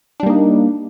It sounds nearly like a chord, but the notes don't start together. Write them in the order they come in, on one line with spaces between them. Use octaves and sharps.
D4 G3 A#3 D#4